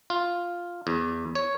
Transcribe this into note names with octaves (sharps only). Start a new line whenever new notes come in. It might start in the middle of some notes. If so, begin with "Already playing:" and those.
F4
E2
C#5